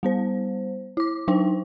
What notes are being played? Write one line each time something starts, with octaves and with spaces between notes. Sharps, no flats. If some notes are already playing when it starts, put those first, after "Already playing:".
G3 B3 C5
E4 D6
F#3 D4 D#4 C5 G5